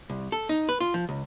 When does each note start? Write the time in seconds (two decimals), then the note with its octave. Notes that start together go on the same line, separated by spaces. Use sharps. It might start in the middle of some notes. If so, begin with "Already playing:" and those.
0.10 C2
0.32 A4
0.49 D#4
0.69 B4
0.81 F4
0.94 F3
1.09 C#2